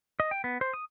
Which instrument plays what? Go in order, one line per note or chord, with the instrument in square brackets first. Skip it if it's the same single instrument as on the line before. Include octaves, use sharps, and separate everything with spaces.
[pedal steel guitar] D#5
G5
B3
C5
D#6